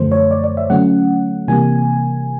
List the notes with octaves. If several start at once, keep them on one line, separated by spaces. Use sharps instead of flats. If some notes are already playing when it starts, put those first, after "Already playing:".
Already playing: F#2 D3 F3 A3 C5
C#5
D5
D5
E5
D3 F#3 A3 C#4 F#5
C3 E3 G3 A#3 D4 G#5